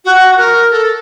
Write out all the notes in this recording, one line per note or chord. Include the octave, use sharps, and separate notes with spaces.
F#4
A#4
A#4
A4